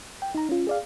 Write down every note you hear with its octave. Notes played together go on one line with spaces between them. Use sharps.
G5
D#4 A#5
C#4 F4
G#4 D5 F5